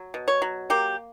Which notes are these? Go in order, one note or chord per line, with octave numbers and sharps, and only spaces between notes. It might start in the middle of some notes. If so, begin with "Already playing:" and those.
Already playing: F#3
B2
C#5
F#3
A#3 G4